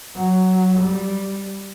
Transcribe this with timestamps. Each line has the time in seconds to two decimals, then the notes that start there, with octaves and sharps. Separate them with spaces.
0.16 F#3
0.81 G3